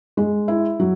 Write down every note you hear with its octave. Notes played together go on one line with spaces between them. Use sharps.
G#3
E4
F#3